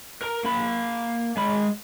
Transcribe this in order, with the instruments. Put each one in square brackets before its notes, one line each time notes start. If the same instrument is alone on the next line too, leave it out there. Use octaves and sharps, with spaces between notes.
[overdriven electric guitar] A#4 A#5
A#3 B5
G#3 B5